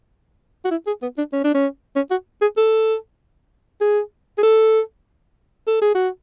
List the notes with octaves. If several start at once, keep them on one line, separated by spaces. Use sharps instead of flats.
F#4
E4
G#4
B3
D4
C#4
D4
C#4
C#4
F#4
G#4
A4
G#4
G#4
A4
A4
G#4
F#4